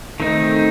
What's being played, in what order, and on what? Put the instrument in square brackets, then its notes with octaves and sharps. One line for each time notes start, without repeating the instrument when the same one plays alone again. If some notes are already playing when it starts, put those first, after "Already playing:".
[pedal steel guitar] D#3 A3 C4 D#4